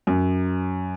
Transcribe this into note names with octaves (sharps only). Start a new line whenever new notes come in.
F#2